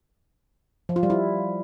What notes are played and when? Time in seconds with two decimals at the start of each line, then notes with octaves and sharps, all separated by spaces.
0.89 F3
0.96 F4
1.03 G3
1.10 E4